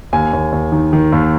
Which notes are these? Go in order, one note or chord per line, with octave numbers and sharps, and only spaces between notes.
D#2 G#5
D#2
D#2
D#3
D#3
D#2